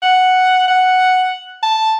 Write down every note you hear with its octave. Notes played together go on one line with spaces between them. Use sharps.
F#5
F#5
A5